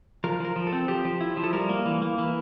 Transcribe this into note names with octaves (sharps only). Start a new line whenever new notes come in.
F3 A#4
F3 A#4
F3
A4
C4
F3 G4
F3
E4
F3
A4
G3 A#4
A#3
E3
A#3
E3